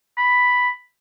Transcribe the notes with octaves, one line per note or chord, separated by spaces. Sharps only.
B5